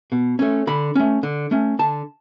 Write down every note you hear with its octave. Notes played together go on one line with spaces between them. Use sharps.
B2
A3 C#4
D3 B5
A3 C#4
D3
A3 C#4
D3 A5